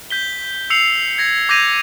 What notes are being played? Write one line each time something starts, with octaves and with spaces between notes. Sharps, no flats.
G6 B6 G7
E6 C7 C#7 F7
G#6 A#6 C#7
D6 G6 G#6 A#6 D#7 F7